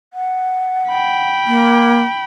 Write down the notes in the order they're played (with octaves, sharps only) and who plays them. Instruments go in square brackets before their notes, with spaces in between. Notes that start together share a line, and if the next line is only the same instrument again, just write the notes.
[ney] F#5
[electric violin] G5 B5
[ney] A#3